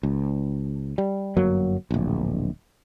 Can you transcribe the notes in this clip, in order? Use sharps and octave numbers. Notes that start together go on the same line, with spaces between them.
C#2
G3
G1 F#2 F#3 A#3
D1 A#1